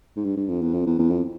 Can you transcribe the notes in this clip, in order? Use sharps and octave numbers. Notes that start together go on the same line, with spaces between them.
G#2
G2
G2
F2
E2
F2
E2
E2
F2